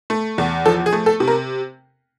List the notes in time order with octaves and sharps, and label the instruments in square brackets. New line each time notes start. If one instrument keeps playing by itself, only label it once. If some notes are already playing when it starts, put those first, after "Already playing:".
[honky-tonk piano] A3
E2
F3 A4
G#4
A3
A4
C3
A#4